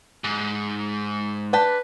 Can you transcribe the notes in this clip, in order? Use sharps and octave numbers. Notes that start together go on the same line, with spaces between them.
G#2
D4 B4 G5 A5